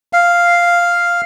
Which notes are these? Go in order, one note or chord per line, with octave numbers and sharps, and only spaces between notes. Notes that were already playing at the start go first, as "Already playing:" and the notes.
F5